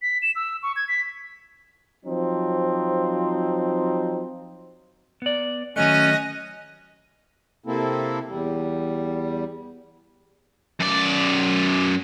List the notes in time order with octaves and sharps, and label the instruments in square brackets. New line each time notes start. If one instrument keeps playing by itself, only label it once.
[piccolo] B6
E7
E6
C#6
G#6
B6
[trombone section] F3 F#3 C4 D#4
[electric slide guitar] B3 D5
[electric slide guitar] D#3 F#3 A3 [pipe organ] C#4 [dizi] D#5 [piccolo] F#6
[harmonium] C3 A#3 C4 E4 A4
E2 G3
[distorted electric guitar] F#2 D5